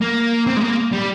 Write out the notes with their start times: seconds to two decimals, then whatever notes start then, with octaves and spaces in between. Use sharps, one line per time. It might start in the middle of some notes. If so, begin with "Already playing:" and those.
0.01 A#3
0.47 C4
0.57 G#3
0.62 A#3
0.93 G3